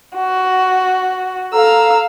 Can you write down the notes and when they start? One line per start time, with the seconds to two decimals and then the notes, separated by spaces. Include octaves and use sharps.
0.16 F#4
1.52 A4 F5 A#5 E6